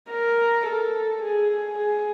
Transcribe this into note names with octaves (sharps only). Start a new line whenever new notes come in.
A#4
A4
G#4
G#4